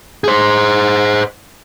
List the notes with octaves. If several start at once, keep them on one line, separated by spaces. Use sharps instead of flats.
G#4 C5